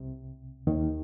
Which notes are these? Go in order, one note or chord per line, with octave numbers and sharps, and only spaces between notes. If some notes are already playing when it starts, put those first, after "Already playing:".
Already playing: C2 C3
D#2 D#3